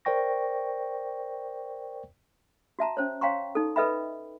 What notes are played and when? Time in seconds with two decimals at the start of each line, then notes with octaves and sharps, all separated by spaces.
0.05 A#4 C5 D5 G5 C#6 A#6
2.79 F#4 E5 A5 A#5
2.97 C#4 C5 C#5
3.21 C#5 F5 G5 A#5 C6 C#6
3.55 D#4 A4
3.76 A4 B4 D#5 E5 G5 B5